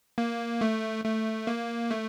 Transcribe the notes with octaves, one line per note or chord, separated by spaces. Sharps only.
A#3
A3
A3
A#3
A3